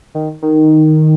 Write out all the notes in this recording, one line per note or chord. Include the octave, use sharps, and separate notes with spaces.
D#3
D#3